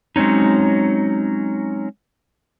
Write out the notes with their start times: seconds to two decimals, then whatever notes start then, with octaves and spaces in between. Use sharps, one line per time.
0.16 F#3 G#3 C4 C#4 D#4